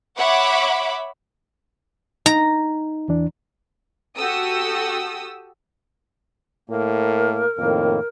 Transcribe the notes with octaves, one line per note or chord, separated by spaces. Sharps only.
C#5 E5 F#5 B5 D6
D#4 A#5
E2 E3 D4
F#4 G4 A4 D#6 E6
A2 A#3 A#4
F2 A2 D#3 A#3